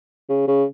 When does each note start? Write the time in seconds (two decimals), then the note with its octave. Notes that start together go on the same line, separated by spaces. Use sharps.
0.29 C#3
0.48 C#3